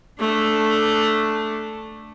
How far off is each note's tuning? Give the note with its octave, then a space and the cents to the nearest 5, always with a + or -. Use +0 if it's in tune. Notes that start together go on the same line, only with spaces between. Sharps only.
A3 +0 D4 +0